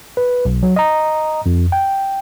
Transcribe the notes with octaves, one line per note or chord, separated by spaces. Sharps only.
B4
B1
F#3
D#5 A#5
F2
G5